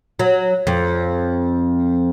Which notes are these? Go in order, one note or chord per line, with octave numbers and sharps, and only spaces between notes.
F#3
F2